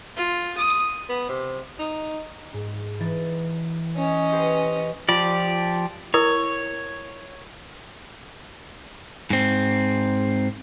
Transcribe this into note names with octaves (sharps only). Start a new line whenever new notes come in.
F4
D#6
B3
C3
D#4
G#2
E3 D#4 A6
C#4 D#5
G4 B4 C5
F3 F4 G4 D5
E4 A#4 C#5 D#6
G#2 C4